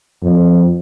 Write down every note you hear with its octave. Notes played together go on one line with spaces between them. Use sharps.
F2